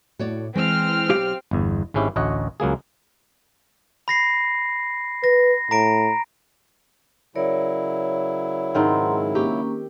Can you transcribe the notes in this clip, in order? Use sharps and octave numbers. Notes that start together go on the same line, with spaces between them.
A2 F#4 C#5 D5
E3 G#3 C4 F6
B1 G4 F5
G1 E2
G#1 G#2 C#4 E4 G4
A1 D2 C#5 D#5 F#5
C#2 F#3 A#3 G#4
B5 A#6 C7
B4 A#6
A2 A#5 D7
C#3 F#3 E4 A#4 C#5 D5
G#2 D#3 C4 F#5 A#5 C6
A#3 C#4 G4